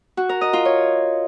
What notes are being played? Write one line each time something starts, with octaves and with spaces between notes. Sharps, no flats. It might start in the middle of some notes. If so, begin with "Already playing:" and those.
F#4
A#4
D#5
F4
C#5